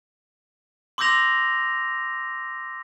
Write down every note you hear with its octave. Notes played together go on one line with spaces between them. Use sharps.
C6 D6 E6 G6 A#6 F7